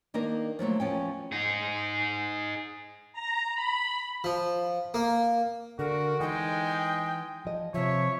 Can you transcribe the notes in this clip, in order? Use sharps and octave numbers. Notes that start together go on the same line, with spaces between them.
D#3 A#3 D4 D#4 A#4
F3 F#3 A3 A#3
E2 F3 C#4 G5
D#4 G#4
A#5
B5
F3
A#3
D3 F#4 A#4
E3 G#3 D#4 G5
F3 D#5
C3 F3 C#5 E5